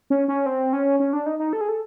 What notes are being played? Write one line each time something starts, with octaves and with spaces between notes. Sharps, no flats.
C#4
C#4
C4
C#4
C#4
D4
D#4
D#4
A4
G#4
A4